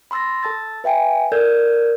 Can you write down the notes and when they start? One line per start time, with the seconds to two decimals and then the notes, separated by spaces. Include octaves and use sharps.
0.11 B5 C6 E6 A6 A#6
0.43 A4 A5 E6 A6
0.84 B4 E5 G5 G#5
1.32 A4 A#4 D5 E6 G6 G#6